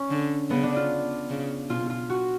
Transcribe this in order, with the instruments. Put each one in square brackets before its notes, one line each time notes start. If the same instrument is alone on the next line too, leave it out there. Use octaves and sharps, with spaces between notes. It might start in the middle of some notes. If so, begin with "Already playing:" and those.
Already playing: [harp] C#4
[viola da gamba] D3
[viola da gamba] C#3 [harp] B3
[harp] D4
F4
[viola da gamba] C#3
[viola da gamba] B2 [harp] F4
[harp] F4
F#4